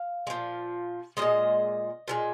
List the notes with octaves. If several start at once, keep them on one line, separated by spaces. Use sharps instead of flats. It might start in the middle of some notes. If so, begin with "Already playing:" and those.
Already playing: F5
G#3
A#2 F3
A#2 F3 G#3 D#5
A#2 F3 G#3